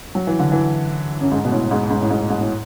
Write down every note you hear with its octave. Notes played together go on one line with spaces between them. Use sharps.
F#3
E3
D3
E3
F#2
G#2
B2
A2
G#2
G#2
A2
G#2
G#2
A2